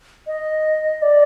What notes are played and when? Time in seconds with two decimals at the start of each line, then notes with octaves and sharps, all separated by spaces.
0.27 D#5
1.02 D5